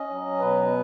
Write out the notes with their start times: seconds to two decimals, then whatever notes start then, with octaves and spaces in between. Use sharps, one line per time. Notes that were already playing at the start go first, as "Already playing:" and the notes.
Already playing: C#4 D#5
0.11 F#3
0.40 B2 B4